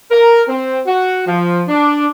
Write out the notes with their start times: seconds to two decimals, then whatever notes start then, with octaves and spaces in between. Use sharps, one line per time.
0.11 A#4
0.48 C4
0.86 F#4
1.27 F3
1.68 D4